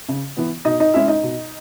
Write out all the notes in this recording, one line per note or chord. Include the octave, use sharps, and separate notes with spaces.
C#3
E3 B3
B2 D#4 D#5
D#4 D#5
G#3 C#4 E4 E5
D#4 D#5
B2